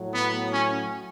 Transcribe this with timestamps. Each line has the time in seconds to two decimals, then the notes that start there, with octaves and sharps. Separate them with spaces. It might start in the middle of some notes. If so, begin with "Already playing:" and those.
Already playing: A2 F#3
0.15 B3
0.53 C#4